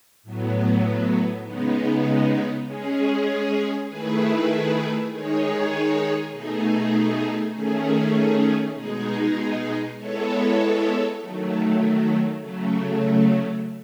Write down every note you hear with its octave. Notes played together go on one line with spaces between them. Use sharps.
A2 F#3 B3
C#3 G#3 B3 D#4
G#3 C#4 G#4
D#3 A3 E4 G#4 B4
D#3 G#3 D#4 G#4 C#5
B2 A3 D#4 G#4
D#3 A3 C#4 G#4
B2 G#3 D#4 G#4
G#3 B3 E4 A4 C#5
D#3 F#3 A3
C#3 F#3 A3